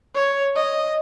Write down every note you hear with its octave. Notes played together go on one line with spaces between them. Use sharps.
C#5
D#5